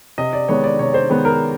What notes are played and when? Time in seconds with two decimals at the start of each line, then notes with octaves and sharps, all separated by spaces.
0.18 C3 D#5
0.33 D5
0.48 D#3 G#3 B3 C#5
0.64 D5
0.79 C3 C#5
0.94 C5
1.10 D#3 G#3 B3
1.25 A#4